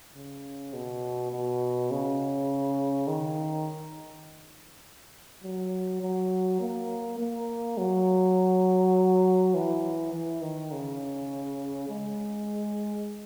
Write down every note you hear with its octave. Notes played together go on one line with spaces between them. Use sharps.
C#3
B2
B2
C#3
D#3
F#3
F#3
A#3
A#3
F#3
E3
E3
D#3
C#3
G#3